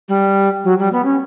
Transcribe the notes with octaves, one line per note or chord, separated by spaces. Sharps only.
G3
F#3
G3
B3
C#4